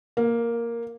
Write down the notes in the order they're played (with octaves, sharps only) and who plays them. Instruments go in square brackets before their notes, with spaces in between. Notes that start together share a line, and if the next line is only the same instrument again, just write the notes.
[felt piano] A#3